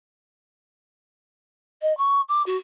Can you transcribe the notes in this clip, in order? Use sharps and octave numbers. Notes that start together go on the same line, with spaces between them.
D#5
C#6
D6
F#4